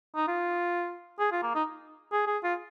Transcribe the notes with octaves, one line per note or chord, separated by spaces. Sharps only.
D#4
F4
G#4
F4
A#3
D#4
G#4
G#4
F4